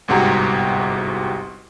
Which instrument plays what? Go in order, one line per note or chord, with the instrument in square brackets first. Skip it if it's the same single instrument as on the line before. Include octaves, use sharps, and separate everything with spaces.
[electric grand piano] G1 C2 G#2 F#4 G4 A#5